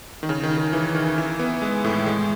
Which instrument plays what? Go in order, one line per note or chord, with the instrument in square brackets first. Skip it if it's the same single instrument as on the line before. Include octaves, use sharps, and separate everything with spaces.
[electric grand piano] D#3
C#3
D#3
D#3
E3
D#3
E3
B3
G#3
A2
G#3